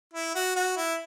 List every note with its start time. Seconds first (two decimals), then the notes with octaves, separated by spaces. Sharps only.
0.14 E4
0.35 F#4
0.56 F#4
0.77 E4